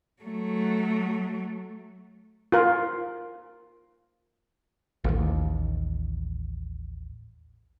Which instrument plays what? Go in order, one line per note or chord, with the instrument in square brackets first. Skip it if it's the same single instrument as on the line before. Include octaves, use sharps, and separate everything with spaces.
[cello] F#3 A3
[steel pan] F4 A#4
[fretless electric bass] A1 D#2